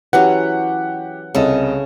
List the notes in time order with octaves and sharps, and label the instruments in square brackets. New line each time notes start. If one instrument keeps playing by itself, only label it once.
[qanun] E3 F#3 C#4 [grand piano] G4 [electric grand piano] F#5
[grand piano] C2 D#5 [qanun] C#3 A4